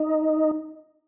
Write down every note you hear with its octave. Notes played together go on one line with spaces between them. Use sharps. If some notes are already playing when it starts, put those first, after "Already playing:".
Already playing: D#4